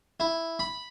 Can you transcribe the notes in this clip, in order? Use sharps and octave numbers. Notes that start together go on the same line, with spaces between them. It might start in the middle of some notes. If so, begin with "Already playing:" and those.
E4
B5